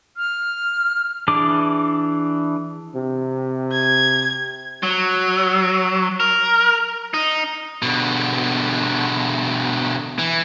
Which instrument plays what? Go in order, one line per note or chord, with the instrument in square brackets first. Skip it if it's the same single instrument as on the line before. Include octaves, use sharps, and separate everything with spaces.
[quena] F6
[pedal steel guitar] E3 D4 G#4 D6
[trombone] C3
[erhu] G#6
[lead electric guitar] F#3
A#4
D#4
B2 D3
E3